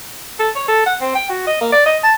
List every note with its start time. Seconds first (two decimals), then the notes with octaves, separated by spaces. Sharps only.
0.39 A4
0.55 C#5
0.68 A4
0.86 F#5
1.01 C4
1.15 G5
1.29 F#4
1.47 D#5
1.61 A#3
1.72 D5
1.86 D#5
2.03 A5